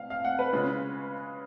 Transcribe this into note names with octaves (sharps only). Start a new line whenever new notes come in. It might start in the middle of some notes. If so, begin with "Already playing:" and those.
Already playing: F5
F5
F#5
B4
C#3 G#3 C#4 F4